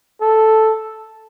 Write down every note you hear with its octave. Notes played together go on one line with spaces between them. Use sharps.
A4